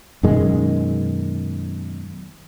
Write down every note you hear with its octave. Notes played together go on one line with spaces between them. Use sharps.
F#2 B2 D#3 G#3